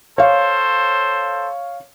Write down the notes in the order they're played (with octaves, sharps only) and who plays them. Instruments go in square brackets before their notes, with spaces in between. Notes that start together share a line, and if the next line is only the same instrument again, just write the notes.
[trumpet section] A4 C5 [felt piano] C#5 F5